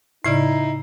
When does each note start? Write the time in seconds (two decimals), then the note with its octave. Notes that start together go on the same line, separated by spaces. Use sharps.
0.24 A2 C#3 D#4 E4 D5 C7